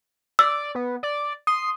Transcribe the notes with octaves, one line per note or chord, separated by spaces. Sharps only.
D5 E6
B3
D5
C6 D#6